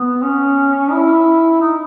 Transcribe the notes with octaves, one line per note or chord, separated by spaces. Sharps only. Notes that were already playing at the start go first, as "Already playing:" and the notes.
Already playing: B3
C#4
E4
D#4